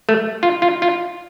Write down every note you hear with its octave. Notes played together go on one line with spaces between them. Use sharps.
A3
F4
F4
F4